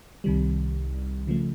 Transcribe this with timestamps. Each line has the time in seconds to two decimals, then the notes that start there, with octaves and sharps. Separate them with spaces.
0.24 C2 C3 D#3 G3
1.27 C#3 F3 A3